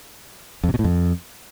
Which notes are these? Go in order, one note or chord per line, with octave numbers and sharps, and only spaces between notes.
F2
C3
B2
A2
F2